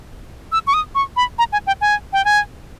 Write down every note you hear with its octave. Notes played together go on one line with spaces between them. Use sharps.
E6
C#6
D#6
C#6
B5
A#5
G#5
G5
G#5
G5
G#5